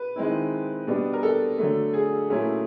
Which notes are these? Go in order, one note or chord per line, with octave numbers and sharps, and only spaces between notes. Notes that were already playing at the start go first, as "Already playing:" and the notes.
Already playing: B4
D#3 G#3 C4 E4
B2 G3 B3 D4
A#4
A4
D3 F#3 A3
G#4
A#2 F#3 A3 C#4 E4